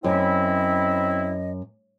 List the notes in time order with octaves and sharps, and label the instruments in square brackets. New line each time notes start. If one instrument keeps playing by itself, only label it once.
[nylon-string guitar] F#2 [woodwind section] C4 E4 [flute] D#5